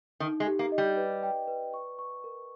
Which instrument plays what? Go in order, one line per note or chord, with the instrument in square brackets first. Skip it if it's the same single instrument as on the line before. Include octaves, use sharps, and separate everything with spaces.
[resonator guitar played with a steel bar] D#3 [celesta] D#4
[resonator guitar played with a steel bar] G#3
[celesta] G4
[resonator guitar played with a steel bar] A#3
[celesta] D#5
[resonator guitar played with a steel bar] G3
[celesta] B4
G5
B4
C#6
C#6
A#4